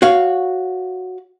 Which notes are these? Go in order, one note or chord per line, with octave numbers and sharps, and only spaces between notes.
F#4 C#5 F5